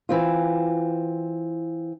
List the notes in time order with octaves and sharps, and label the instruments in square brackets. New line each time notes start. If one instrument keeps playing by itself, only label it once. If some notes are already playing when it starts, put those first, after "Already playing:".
[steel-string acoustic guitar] E3 C4 F4